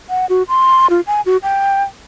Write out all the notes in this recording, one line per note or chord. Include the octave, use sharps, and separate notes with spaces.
F#5
F#4
C6
F4
G#5
F#4
G5